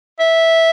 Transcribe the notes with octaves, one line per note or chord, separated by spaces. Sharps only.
E5